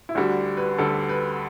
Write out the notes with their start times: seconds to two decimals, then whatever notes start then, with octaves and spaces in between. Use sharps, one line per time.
0.09 E4
0.15 D2 D3 G3 F#4
0.57 B4
0.78 D2 D3 G3 A4
1.09 B4